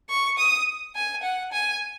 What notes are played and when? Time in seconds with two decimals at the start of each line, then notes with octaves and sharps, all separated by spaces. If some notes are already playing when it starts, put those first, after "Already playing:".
0.10 C#6
0.38 D#6
0.95 G#5
1.23 F#5
1.52 G#5